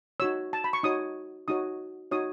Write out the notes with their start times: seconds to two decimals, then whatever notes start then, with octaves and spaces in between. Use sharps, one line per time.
0.20 D#4 F#4 C#5 E6
0.53 A5
0.64 B5
0.73 C#6
0.83 D#4 F#4 C#5 D#6
1.48 D#4 F#4 C#5 D#6
2.11 D#4 F#4 C#5 D#6